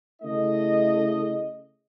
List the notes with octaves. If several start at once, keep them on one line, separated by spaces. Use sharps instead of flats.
C#3 A3 E4 D#5